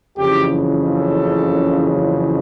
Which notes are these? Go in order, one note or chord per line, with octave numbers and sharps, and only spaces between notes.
F#1 F2 C#3 E3 G4
A4